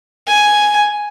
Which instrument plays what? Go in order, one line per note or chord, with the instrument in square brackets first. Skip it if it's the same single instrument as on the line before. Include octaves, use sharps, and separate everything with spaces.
[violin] G#5